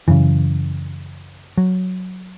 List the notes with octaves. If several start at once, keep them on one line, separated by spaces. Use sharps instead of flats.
F#2 C#3 E3
F#3